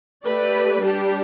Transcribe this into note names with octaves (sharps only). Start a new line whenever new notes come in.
A3 G4 B4 D5
G3 D4 G4